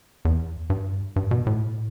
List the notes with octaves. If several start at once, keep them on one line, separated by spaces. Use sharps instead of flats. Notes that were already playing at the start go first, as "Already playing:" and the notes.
E2
G2
G2
B2
A2